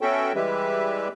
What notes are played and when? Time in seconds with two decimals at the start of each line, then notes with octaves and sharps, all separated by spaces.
0.01 B3 C#4 F#4 A4 E5 G5
0.35 E3 G3 G#3 G4 B4 E5